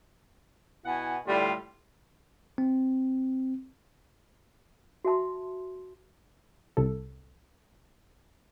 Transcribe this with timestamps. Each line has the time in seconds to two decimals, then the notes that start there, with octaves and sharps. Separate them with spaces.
0.85 B2 E4 F#5 G#5
1.27 A2 D3 G3 E4 F4
2.58 C4
5.05 F#4 E5 A5 C6
6.77 C2 C3 A4